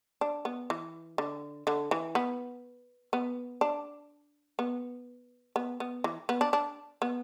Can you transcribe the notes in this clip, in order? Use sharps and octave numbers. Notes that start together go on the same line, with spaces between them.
D4
B3
E3
D3
D3
E3
B3
B3
D4
B3
B3
B3
E3
B3
D4
D4
B3